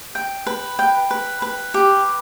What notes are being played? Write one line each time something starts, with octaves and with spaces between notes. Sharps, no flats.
G5
B4
G5
B4
B4
G4